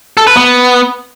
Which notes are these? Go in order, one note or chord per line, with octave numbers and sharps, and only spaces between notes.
A4
B4
B3